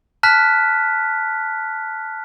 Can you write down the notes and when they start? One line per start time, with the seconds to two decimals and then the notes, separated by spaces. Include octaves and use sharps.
0.23 A5 F6 F#6 B6